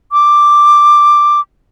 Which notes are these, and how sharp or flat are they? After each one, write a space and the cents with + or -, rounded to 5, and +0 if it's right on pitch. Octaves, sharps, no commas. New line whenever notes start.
D6 +5